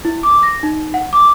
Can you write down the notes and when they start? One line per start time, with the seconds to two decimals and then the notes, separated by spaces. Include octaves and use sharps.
0.05 E4
0.23 D6
0.43 A#6
0.63 D#4
0.94 F#5
1.13 D6